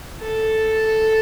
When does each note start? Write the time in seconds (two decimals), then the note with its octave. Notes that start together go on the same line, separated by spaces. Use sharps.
0.22 A4